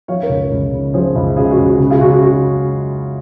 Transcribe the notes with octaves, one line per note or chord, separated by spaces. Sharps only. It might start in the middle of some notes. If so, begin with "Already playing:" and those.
F3 C#5 F5
A#4 C#5
C#2
C#2
C#3
F3 G#4 C5
C#2
C#3 F4 G#4
F#4
C#2
F#4
C#3
F4 G#4
C#3 F#4
F#4
F#4